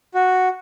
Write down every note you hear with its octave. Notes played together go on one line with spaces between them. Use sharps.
F#4